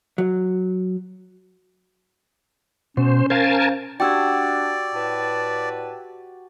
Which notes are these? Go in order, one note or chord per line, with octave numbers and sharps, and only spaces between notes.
F#3
B2 C#4 C5
A#4 C5 F5 G#5 A5
D4 F#4 G4 D5 G5 C6 E6 G#6
A2 B4 A5